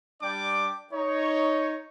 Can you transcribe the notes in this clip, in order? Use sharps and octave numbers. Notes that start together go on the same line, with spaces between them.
G3 D4 D5 G5 D6
D#4 C#5